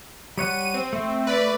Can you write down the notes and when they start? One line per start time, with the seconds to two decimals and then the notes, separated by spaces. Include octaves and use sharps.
0.38 G3 C#5 F#5 D#7
0.74 C4
0.93 A3
1.27 B4 D5